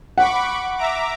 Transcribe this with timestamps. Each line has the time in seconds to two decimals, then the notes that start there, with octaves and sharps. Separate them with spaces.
0.18 F#5 B5 C#6 D6
0.77 E5 A#5 D6